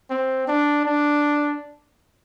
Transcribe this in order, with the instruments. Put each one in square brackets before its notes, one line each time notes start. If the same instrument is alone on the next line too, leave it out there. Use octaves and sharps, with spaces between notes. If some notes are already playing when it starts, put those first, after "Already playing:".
[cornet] C4
D4
D4